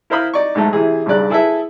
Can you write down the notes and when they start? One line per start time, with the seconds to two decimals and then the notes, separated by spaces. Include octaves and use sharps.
0.10 E4 A#4 C5 F5 B5 D#6
0.34 D#4 D5 C#6
0.55 B1 G#2 A3
0.73 C3 E3 G#4
1.06 B1 G2 C#3 D5 F#6
1.30 E4 G#4 A4 B4 E5